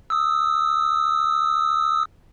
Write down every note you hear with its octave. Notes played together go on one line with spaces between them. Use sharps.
D#6 E6